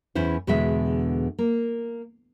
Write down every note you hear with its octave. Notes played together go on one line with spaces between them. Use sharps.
E2 C#4 E4 C5
E2 B2 D3 G#3 E5
A#3